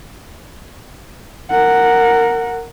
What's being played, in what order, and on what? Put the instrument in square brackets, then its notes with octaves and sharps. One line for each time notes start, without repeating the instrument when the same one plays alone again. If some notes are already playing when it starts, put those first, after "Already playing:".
[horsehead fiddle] A#4 F#5